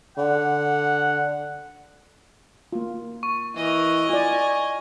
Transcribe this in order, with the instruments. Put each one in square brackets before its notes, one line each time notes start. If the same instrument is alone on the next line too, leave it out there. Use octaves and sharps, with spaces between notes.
[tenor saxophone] D3 [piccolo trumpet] F#5
[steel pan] A#3 F4
[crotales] C#6
[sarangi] E3 [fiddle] A#4 D#5
[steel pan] F4 D5 [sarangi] G#5